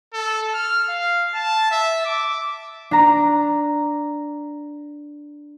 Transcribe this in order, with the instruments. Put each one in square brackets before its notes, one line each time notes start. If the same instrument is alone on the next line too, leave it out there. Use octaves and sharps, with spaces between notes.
[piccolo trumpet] A4
F6
F5
A5
E5
D6
[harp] D4 A#5